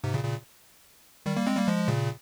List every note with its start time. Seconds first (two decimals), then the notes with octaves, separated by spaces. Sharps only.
0.04 G#2 C3
0.14 A#2 C#3
0.24 A#2 C#3
1.26 D#3 G3
1.37 G3 A#3
1.47 G#3 C4
1.57 G3 A#3
1.67 F3 G#3
1.88 A#2 C#3